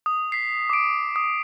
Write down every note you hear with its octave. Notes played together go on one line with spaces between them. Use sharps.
D#6
B6 C7
D6 D7
D#6